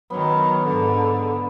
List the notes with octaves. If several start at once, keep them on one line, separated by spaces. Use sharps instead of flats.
D#3 F#3 B3
G#2 D3